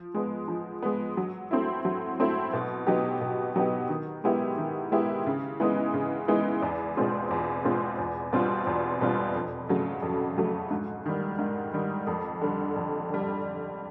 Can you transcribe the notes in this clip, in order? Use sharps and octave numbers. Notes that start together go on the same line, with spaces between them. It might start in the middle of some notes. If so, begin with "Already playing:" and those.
Already playing: F3
G#3 B3
F3
G#3 B3
F#3
A3 C4 E4
F#3
A3 C4 E4
B2
F#3 B3 D#4 G4
B2
F#3 B3 D#4 G4
D#3
G#3 B3 E4 G4
D#3
G#3 B3 E4 G4
C#3
E3 G#3 B3 D#4
C#3
E3 G#3 B3 D#4
E2
B2 G#3 C4 F4
E2
B2 G#3 C4 F4
E2
B2 G3 C4 F4
E2
B2 G3 C4 F4
F2
C#3 F#3 A3
F2
C#3 F#3 A3
G#2
D#3 G3
G#2
D#3 G3
F2
D3 G3
F2
D3 G3